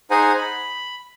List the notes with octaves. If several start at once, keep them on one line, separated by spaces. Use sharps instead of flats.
D#4 G#4 C5 F#5 G#5 A#5
B5